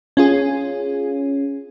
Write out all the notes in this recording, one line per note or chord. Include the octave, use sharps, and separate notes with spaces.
C#4 F4 G#4